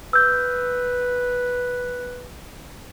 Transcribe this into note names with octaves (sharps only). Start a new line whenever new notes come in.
B4 E6 G6